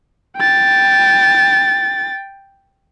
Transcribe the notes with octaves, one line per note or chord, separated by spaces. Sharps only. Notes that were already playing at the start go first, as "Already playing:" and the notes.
G5 A6